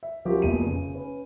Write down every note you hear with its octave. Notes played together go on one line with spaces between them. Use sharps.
E5
F3 F#3 C#4 F4 G4 A#4
F1 A#1 E2 D#7
C#3
C#4 B4